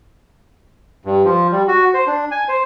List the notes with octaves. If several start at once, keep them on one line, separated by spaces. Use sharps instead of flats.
G2
F3
G3
F#4
C5
D4
G#5
C5